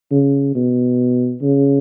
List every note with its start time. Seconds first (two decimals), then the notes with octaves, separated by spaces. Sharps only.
0.11 C#3
0.55 B2
1.42 C#3